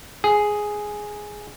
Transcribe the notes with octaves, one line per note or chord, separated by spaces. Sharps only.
G#4